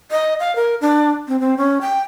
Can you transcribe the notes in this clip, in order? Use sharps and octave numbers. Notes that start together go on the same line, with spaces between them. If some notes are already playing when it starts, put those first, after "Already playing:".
D#5
F5
A#4
D4
C4
C4
C#4
G5